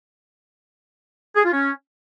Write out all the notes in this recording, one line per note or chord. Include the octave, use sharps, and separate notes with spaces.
G#4
F4
C#4